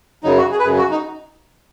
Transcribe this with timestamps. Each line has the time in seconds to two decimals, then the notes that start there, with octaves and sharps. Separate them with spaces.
0.23 F#2 C#3 F#3 D#4
0.38 F#4
0.51 G#4
0.59 B4
0.64 F#2 C#3 F#3 G#4
0.78 F#4
0.91 D#4